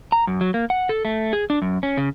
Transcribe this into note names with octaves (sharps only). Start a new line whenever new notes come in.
A#5
F#2
F#3
A#3
F#5
A4
A3
G#4
D4
F#2
C#4
C#3